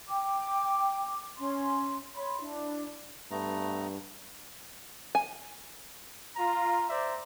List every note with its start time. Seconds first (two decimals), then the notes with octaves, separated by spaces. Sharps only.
0.08 G5 D6
1.39 C#4 C6
2.15 C#5 B5 C6
2.40 D4 E4
3.31 G2 A3 B3 A#5
5.15 G#5
6.36 F4 A#5
6.89 C5 D5 E5 A#5